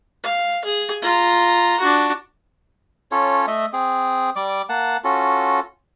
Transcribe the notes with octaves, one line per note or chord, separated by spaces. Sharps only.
F5
G#4
F4 A#5
D4 F#4
C#4 F4 A4 C#5
A3 D#5 E5
C4 G#4
G3 D5 D6
A#3 F#5 A5
C#4 F4 F#4 A4